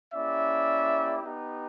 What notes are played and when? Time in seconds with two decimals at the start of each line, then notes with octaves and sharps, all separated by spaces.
0.13 A#3 C#4 E4 G4 D5 E5
1.22 B3 D#4 G4